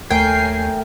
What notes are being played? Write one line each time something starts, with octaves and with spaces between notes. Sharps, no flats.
D#2 A3 A#4 C#5 G5 G#5 C7